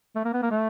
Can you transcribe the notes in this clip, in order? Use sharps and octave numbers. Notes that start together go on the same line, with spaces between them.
A3
A#3
B3
A#3
A3